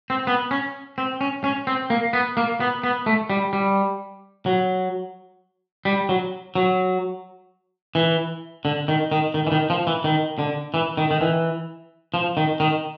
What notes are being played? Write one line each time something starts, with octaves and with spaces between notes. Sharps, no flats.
C4
B3
C#4
C4
C#4
C#4
C4
A#3
B3
A#3
B3
B3
A3
G3
G3
F#3
G3
F#3
F#3
E3
D3
D#3
D#3
D#3
E3
D#3
F3
E3
D#3
D3
E3
D#3
D#3
E3
F3
D#3
D#3